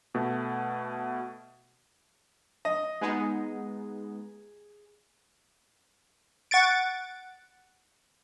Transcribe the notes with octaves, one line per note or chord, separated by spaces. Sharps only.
B2 A3
D#5
G#3 B3 D#4 G#4
F#5 C#6 A6 D7